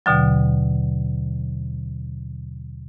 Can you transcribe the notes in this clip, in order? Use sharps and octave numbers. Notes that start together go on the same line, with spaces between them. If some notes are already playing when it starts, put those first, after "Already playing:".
D#2 B2 D3 F#3